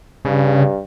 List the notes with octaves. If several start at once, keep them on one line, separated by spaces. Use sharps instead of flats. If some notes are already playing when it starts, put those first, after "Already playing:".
G2 C#3